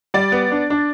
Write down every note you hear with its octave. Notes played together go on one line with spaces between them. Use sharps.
G3 D5
B3
D4
D4